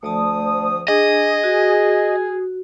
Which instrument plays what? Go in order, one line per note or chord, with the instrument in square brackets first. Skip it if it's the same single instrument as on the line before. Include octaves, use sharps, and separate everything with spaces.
[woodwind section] D2 F3 D#6 [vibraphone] A3 D5 A5
[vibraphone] D4 [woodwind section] G#4 [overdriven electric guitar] D#5
[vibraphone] F#4